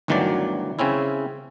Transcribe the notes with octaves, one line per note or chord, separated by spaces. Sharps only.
G1 D2 D#3 E3 F#3 D5
C#3 C4 C#4 E4